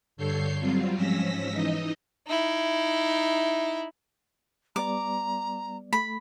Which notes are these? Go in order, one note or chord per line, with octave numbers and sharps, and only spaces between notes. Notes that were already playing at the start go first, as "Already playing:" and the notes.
G2 D3 A4 C#5 G6 C7
F#3 G3 C4 F4
G#2 F3 C#4 E6 A#6 B6
E3 D#4 D#5
D#4 E4
G3 B3 D5 A#5 D6
A3 B5